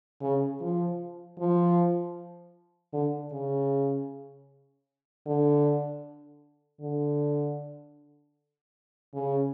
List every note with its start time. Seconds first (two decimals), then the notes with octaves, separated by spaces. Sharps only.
0.22 C#3
0.61 F3
1.38 F3
2.93 D3
3.32 C#3
5.26 D3
6.81 D3
9.14 C#3